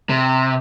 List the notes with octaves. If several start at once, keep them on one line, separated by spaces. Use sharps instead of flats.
C3